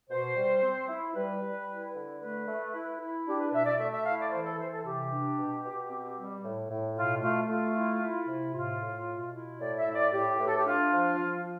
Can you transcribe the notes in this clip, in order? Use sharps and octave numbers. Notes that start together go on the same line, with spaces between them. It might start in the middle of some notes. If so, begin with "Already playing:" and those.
B2 C5
G3
C4
E4
G3 B4
G3
E4
D3
A3 B4
A3
E4
E4
D4 G4
B4
B2 E5
D5
A3 E5
E5
E4 F5
D5
E3 C5
A4
E3 C5
A4
C3 G4
D4
B2
B2
C4
G3
A2
A2
B2 F4
A3 F4
A3 F4
E4
E4
C3
A2 F4
A2
B2
E4
A2 D5
E5
A2
D5
A2 G4
A2 B4
A4
G4
D4 F4
F3
F3